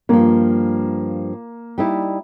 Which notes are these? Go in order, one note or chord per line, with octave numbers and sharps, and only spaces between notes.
G2 F3 A#3
G3 D#4 E4